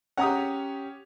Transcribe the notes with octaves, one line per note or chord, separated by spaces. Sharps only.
C#4 G4 F#5 A#5 D#6